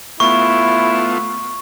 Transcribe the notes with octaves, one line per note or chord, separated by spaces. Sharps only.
A3 B3 E4 F4 C#6